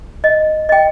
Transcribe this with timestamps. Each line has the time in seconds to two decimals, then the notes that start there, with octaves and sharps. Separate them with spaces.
0.24 D#5
0.69 D#5 G5